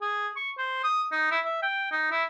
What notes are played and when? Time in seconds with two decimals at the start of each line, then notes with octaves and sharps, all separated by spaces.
0.02 G#4
0.36 C#6
0.58 C5
0.84 D#6
1.12 D#4
1.31 E4
1.45 E5
1.62 G5
1.92 D#4
2.11 E4